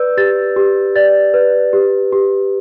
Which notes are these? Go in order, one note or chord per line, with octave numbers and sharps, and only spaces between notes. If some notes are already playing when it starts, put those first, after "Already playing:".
Already playing: B4 D5 E6 G6
G4 A6
G4
D5 A6
B4
G4
G4